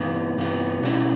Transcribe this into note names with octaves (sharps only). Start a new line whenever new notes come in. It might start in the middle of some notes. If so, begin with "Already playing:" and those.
Already playing: G2 E3 B3
G2 E3 B3
B2 G3 C#4 E4